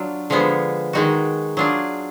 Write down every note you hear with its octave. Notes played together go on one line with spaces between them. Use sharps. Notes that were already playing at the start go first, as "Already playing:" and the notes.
Already playing: F#3 D4 F4
D3 F3 G#3 B3
D#3 G#3 D#4 F#4
F#3 D4 F4 G#4